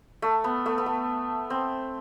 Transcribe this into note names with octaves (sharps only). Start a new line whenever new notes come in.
A3
B3
A3
B3
A3
C4